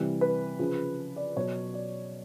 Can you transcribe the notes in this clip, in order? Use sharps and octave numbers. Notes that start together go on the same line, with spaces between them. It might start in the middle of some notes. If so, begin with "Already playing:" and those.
Already playing: C3 E3 G3
B4
C#3 F3
D5
B2 F#3 C#5
D5